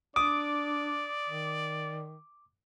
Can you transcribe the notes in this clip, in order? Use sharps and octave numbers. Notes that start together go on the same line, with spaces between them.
D4 D5 D6 D#6
D#3